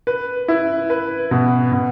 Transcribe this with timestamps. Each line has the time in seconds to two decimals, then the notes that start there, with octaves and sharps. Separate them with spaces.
0.07 B4
0.48 E4
0.90 B4
1.31 B2
1.72 B2